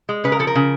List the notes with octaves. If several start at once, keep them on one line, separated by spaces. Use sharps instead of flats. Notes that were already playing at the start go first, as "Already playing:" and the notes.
G#3
C#3 B4
A#4
F3 A4
A#4
C#3